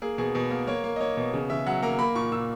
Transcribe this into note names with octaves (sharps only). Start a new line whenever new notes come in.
A#3 G#4
B2 G#4
B2 G#4
A#3 A#4
A#3 C#5
A#3
D#5
A#3 C#5
B2
C#3
C#3 E5
F#3 F#5
A#3 A#5
A#3 B5
A#2 C#6
A#2 E6